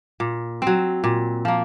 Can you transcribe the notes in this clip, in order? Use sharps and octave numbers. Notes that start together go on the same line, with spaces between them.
A#2
F#3 C4
A#2
F3 A#3